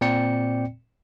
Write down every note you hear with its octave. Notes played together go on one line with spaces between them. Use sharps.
A#2 C4 D5 G5 C#7